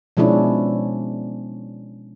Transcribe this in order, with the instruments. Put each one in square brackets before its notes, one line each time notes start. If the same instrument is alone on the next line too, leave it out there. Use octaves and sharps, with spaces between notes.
[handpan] B2 F3 G#3 C#4 D4 E4